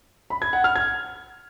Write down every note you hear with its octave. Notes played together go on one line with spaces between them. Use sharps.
B5
G#6
F#5
F6
G#6